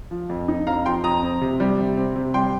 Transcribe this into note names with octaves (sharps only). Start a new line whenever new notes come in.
F3
F2
D#4
F2 F5 A#5
F3 G5 C6
F2 A#5 D#6
C4
C3
G3
C3
C4
C3
G3 G5 C6